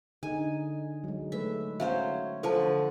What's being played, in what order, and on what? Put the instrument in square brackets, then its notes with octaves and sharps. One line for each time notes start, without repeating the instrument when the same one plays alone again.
[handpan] D3 D#4 G#4 [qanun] G#5
[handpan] F#3 G#3
[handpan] G#3 A3 B4 [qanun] E5
[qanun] F#3 C#4 C5 [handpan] C#5 [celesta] E5 F5
[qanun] D3 F3 C#6 [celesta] A4 A5